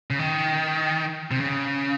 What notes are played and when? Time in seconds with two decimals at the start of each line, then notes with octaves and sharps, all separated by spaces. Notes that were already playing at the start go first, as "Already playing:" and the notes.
0.10 C#3
0.19 D#3
1.31 C3
1.41 C#3